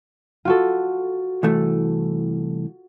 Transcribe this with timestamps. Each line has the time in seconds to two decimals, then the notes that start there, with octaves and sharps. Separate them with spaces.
0.45 F4 F#4 A4
1.43 C2 E3 A3